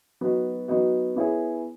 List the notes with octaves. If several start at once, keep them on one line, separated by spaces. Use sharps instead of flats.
F#3 B3 D#4 F#4
F#3 B3 D#4 F#4
B3 E4 G#4 C#5